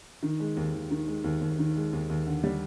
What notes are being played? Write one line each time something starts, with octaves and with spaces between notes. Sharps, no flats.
D#3
G#3
D#2
D#2
D#3
G#3
D#2
D#2
D#3
G#3
D#2
D#2
D3
G3